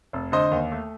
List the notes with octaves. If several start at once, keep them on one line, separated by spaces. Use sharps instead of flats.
F1
D3 C5 D#5
D#2
A3